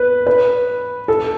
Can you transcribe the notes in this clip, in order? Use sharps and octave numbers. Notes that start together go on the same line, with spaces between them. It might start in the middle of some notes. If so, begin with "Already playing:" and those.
Already playing: B4
B4
A4